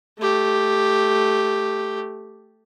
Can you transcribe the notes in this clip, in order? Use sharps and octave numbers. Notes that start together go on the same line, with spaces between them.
A3 G4